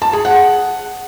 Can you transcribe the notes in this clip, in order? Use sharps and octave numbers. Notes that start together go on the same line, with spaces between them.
A5
G#4
F#5